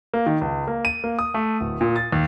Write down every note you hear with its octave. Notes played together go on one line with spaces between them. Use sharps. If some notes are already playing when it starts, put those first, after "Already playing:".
A#3
D#3
C#2
A#3
D#7
A#3
D#6
A3
D1
A#2
A6
D#2